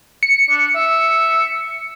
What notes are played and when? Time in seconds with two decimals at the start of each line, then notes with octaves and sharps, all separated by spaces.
0.23 C#7
0.50 D4
0.75 E5